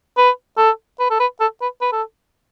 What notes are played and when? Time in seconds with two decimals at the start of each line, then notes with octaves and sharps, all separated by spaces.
0.17 B4
0.57 A4
0.99 B4
1.10 A4
1.20 B4
1.40 A4
1.61 B4
1.81 B4
1.92 A4